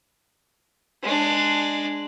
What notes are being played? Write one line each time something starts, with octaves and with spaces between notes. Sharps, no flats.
G#3 D4